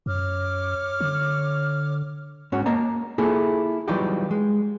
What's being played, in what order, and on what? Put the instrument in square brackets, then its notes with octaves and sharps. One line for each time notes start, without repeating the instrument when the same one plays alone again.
[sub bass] F#2 [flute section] C#5 D6 F6
[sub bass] D3
[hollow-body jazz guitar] G#2 C#4 F#4
A#3 D#5 A5 A#5
A#3 E4 F4 G#4 A4
E3 F#3 G3 D#4 F4 G4
G#3